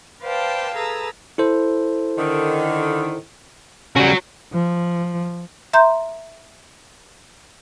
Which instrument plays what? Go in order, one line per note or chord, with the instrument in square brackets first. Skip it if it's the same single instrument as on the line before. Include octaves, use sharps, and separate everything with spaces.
[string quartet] B4 C5 D5 F5 G5 A5
G#4 A4 B4 A#5 E6
[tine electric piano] E4 A4 C5
[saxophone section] D3 D#3
[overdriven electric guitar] C#3 G3 [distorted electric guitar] F#4 C#5
[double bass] F3
[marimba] E5 A#5 C6 G6